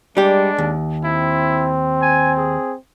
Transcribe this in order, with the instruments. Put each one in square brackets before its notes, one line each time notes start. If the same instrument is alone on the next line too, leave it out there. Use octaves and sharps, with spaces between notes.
[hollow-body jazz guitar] G3 G4 [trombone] G#3 [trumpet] D4
[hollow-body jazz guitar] D#2
[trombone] C4 [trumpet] E4
[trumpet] G#5
G#4